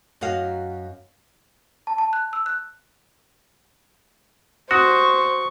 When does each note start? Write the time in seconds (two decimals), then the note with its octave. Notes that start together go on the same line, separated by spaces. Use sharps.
0.21 F#2 F#4 D#5 F5
1.87 A5
1.98 A5
2.13 F#6
2.33 E6
2.46 F#6
4.71 F#4 C5 C#6 D#6